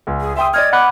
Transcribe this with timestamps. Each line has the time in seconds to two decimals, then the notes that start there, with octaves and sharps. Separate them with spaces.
0.07 C#2
0.20 G#4
0.36 E5 G5 C6 D#6
0.54 D5 D#5 F6 G#6
0.73 F#5 B5 D6 F#6